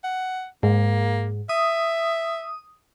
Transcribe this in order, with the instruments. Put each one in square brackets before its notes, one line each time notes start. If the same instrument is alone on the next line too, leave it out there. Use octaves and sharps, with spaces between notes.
[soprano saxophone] F#5
[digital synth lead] G#2 [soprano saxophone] A#3
[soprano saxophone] E5 [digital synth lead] D#6